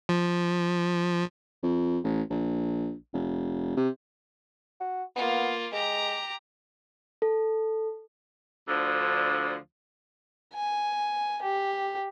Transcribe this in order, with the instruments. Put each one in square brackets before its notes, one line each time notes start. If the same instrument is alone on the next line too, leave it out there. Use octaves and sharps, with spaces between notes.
[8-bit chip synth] F3
[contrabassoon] F2
A1
A#1
F1
C3
[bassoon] F#4
[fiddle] A#3 F4 [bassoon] B3
[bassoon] G#3 [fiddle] G4 A#5
[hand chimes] A4
[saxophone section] D2 D3 F3
[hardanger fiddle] G#5
G4